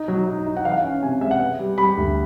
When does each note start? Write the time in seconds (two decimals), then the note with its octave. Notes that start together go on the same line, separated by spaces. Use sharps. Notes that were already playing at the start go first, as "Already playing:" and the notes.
Already playing: D#4
0.08 F#3
0.27 D#4
0.47 D#4
0.57 F#5
0.65 E3 F5
0.72 F#5
0.77 F5
0.83 C#4
1.03 C3 G#5
1.21 G#3 E5
1.31 F#5
1.40 B3
1.59 G3
1.78 G3 B5
1.97 D2